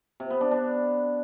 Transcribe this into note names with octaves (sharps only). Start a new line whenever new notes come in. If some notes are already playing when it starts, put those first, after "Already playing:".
C3
B3
D4
D4